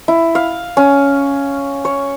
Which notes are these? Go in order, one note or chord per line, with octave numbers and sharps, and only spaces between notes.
E4
F5
C#4
C#5